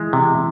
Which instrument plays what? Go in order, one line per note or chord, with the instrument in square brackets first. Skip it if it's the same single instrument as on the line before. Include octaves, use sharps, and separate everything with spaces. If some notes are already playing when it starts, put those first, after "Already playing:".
Already playing: [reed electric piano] E3 E4 [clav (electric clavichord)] G#3
[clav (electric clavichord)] C3